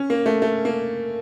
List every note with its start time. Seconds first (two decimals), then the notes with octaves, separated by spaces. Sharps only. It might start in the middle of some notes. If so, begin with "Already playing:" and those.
Already playing: C#4
0.10 A#3
0.26 A3
0.42 A3
0.65 A#3